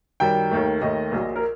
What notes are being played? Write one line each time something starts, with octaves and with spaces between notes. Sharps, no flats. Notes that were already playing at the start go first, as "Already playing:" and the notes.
F#2 D#3 G3 G5
D#2 D#3 A3
D#2 D#3 A3 D#5
A#1 A#2 F#3
A#4